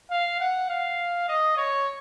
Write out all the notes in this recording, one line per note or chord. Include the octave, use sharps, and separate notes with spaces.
F5
F#5
F5
D#5
C#5